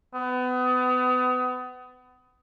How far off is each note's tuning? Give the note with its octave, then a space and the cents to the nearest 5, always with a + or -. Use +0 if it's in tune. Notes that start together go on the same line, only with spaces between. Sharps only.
B3 +30